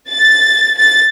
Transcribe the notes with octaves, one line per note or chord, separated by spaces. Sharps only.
A6
A6